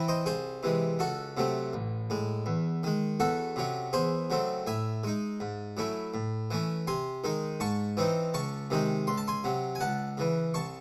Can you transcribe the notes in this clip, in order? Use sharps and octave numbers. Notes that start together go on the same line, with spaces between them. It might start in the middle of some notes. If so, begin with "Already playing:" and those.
Already playing: E3 C4 E4
C5 D#5
C2 G#4 C5
C3 E3 G#3
C#2 F#4 A4
C3 F#3 A3 C4
A1
A2 G#3
E2
D#3 G#3
E2 F#4 A4
C3 F#3 C#4
E2 G#4 C5
C#3 F#3 A3 C4
A2 E5 G#5
G#3 D#4
G#2
F#3 A3 C#4 E4
A2
E3 A3 C#4
C3 G#5 C6
D#3 G#3 D#4
G#2 A5 C#6
E3 C4 D#4
C#2 A5 C#6
C3 D#3 G#3 D#4
C#2 C6
A5
G#5 C6
C3 F#3
G#5
C#2 F#5 A5
C#3 E3
C2 A5 C#6